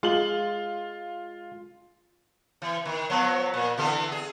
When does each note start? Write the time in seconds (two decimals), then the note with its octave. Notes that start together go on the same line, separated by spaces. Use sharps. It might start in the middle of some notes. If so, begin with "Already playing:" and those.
0.03 G#3 F4 G#4 F#7
2.62 E3
2.85 D#3
3.10 F3 F#3 B3
3.54 A#2
3.78 D3 E3 A4
4.12 G#4